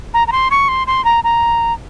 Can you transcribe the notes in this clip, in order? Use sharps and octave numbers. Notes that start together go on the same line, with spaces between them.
A#5
A#5
C6
C#6
C6
C6
A#5
A#5